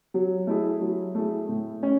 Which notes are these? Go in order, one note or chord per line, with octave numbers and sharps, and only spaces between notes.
F#3
A3 E4 G#4
F#3
A3 E4 G#4
A2
C#4